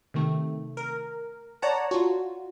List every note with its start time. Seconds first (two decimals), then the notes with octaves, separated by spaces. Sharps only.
0.14 C3 D#3 A3
0.77 A#4
1.62 C#5 D5 F#5 A5 A#5
1.91 F4 F#4